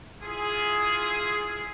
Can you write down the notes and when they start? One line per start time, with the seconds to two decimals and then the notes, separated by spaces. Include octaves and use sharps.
0.22 E4 F4 G#4